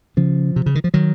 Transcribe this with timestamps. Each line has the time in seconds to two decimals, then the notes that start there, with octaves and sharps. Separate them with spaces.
0.17 C#3 F3
0.56 C3
0.66 C#3
0.75 D#3
0.84 F3
0.94 D#3 F#3